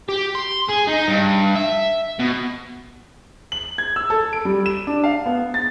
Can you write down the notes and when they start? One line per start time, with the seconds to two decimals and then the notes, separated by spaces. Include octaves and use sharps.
0.09 G4
0.35 C6
0.68 G#4
0.87 D#4
1.08 G2
1.55 E5
2.19 B2
3.52 F#7
3.78 G#6
3.96 E6
4.10 A4
4.33 D7
4.45 G3
4.66 E7
4.87 D4
5.04 F5
5.26 B3
5.54 A6